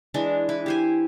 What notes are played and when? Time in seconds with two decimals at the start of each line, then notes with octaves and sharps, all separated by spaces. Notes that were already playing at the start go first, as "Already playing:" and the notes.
0.14 E3 G#3 D4
0.49 E4 B4
0.66 G4 C5 G#5